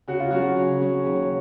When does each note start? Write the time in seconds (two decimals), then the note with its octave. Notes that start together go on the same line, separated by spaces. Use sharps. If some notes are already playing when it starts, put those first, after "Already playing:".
0.08 C#3 F#4
0.20 F4
0.31 F#3 C#4 F#4 G#4
0.56 C#3
0.81 F#3 C#4 G#4
1.04 D#2